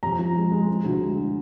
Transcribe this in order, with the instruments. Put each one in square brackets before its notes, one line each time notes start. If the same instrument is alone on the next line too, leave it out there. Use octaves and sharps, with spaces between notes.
[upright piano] F2 A#5
F3
G#3
G#3
G#3
D2
G#3